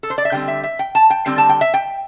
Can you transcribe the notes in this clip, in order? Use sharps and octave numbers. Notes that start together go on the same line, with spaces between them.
A4
C5
D5
E5
D3 G3 C4 G5
E5
E5
G5
A5
G5
D3 G3 C4 G5
A5
G5
E5
G5